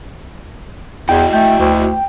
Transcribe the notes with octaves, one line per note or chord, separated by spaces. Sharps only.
E2 E4 F#4 D#5 G5
A3 G5
D2